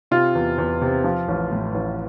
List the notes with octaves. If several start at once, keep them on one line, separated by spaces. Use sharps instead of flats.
C3 F4
E2
E2
C3
F3
A1
A2
A1